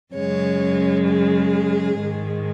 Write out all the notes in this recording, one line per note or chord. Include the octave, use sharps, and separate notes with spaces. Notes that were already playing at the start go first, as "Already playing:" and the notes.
F#2 C#3 G#3 C#5
G#4
G#2 D#3 G#3